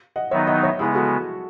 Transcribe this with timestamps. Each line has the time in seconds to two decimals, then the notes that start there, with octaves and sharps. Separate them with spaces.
0.16 D#5 F#5
0.31 D#3 F#3 B3 D#4 C#5 E5
0.47 D#5 F#5
0.63 C#5 E5
0.79 C#3 G#3 B3 E4 G#4
0.95 F#4 A4